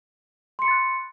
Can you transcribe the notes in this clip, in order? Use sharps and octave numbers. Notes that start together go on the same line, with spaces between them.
B5 C6 F#6 A6 C#7